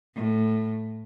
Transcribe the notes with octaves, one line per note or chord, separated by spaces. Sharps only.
A2